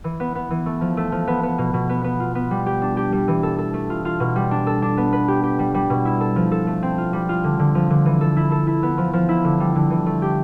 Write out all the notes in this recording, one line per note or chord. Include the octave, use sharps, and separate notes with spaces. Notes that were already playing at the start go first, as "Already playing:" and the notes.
E3
B3
B3
E3
A3
F3
A3
F3
B3
B3
B2
B2
B3
B3
F4
B3
G3
G4
D4
G4
G3
E3
A4
A4
A3
F4
F4
B2
G3
D4
A4
D4
B3
B4
G4
G4
G3
G3
B2
E4
A4
F3
A4
A3
C4
F4
G3
F4
D3
D3
F3
D3
E3
A4
E4
A4
E4
B3
F3
F3
E4
D3
G3
D3
E3
A3
G4